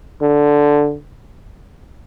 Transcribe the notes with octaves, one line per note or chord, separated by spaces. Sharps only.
D3